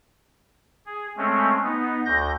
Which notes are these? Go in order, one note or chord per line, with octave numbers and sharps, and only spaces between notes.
G#4
G#3 A3 C4 C#4
B3 D#4
D2 G6 A#6